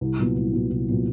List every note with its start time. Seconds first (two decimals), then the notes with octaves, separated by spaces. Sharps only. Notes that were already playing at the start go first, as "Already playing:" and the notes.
0.01 C2
0.19 A#2 F#3 B3
0.36 C2
0.53 A#2 F#3 B3
0.70 C2
0.88 A#2 F#3 B3